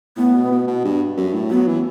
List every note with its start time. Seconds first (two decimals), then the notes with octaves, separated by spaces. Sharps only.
0.17 A2 B3
0.34 B2
0.51 B2
0.67 B2
0.84 G2
1.17 F#2
1.34 A2
1.50 F#3 B3
1.67 E3